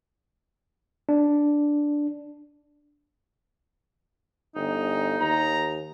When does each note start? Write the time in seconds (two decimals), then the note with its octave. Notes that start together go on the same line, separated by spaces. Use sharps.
1.09 D4
4.55 G1 D#4
5.21 D#2 A#5